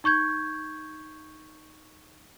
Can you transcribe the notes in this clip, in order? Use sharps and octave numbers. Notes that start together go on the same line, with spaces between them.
D#4 C#6 G6 G#6